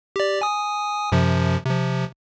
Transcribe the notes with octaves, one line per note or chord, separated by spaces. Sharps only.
G4 D5
G#5 D#6
F#2 C3 F3
C3 F3